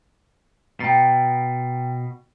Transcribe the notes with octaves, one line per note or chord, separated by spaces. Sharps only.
B2 G5 A#5 A6